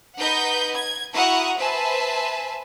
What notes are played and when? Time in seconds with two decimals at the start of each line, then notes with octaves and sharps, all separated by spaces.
0.19 D#4 B4 D#5 F#5 G6
0.74 G#6
1.14 E4 F#4 F#5 A#5 C#6 D#6
1.59 B4 C5 E5 G#5 A5